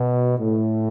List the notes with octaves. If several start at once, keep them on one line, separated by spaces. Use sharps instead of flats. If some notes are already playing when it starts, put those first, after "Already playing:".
Already playing: B2
A2